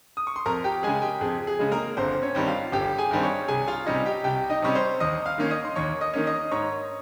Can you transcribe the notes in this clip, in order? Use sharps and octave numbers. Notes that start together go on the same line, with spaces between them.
D#6
C#6
C6
F2 A#4 A#5
G4 G5
C#3 G#3 G#4 G#5
G4 G5
F2 G#4
G#4
C#3 G#3
A#3 A#4
G1 C4 C5
C#4 C#5
G2 D#3 G3 C4
F4 F5
G1 G4 G5
G#4 G#5
G2 D#3 G3 C4
C#5 C#6
C2 G#4 G#5
F4 F5
C3 G3 C#4 D#4 D#5
G4 G5
C2 G4 G5
D#4 D#5
C3 G3 C#4 C#6
C5 C6
D#2 D#5 D#6
F5 F6
D#3 A#3 C#4
D#5 D#6
C6
D#2 C#5 C#6
D#5 D#6
D#3 A#3 C#4
D#5 D#6
G#2 C#5 C#6